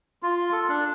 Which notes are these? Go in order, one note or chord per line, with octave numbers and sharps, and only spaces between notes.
F4
A4
D4